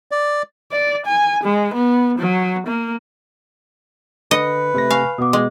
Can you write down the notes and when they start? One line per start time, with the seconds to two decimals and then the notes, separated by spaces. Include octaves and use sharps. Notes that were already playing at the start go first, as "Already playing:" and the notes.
0.11 D5
0.72 D5
1.06 G#5
1.44 G#3
1.74 B3
2.19 F#3
2.67 A#3
4.31 D3 B4 D#5 C#7
4.74 C3 A3 A#6
4.90 F5 G#5 C#6 F6
5.18 B2 B3 D6 D#6
5.33 G#3